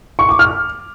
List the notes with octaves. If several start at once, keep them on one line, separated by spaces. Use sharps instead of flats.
C#6
D6
F6